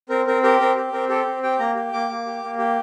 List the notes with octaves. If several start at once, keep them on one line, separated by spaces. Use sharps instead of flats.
C4 A#4
C4 A#4
G4 A#4
C4 A#4
G4
C4 A#4
G4 A4
C4
G4 G5
A#3 A#5
G4
A#3 D6
A#3
G4
A#3
G4